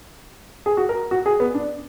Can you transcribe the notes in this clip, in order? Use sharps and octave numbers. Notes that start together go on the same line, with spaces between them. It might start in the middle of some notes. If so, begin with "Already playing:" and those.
G#4
F#4
A#4
F#4
G#4
B3
D4